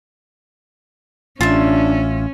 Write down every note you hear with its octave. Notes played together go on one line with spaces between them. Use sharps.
A1 C#4 D4 F4 E5